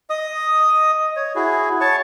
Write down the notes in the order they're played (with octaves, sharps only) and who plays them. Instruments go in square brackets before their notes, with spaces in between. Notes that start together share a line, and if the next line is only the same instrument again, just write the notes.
[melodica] D#5 D#6
C#5
E4 F#4 G#4
C#5 A5 C#6